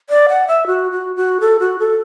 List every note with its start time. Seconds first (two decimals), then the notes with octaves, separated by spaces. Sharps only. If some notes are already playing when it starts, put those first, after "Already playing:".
0.10 D5
0.29 F#5
0.48 E5
0.67 F#4
0.92 F#4
1.16 F#4
1.40 A4
1.60 F#4
1.79 A4